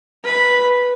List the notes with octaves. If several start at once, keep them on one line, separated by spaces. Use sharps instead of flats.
B4